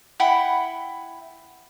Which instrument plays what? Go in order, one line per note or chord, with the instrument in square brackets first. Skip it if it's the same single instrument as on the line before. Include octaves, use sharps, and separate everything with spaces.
[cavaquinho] E4 F#5 G5 B5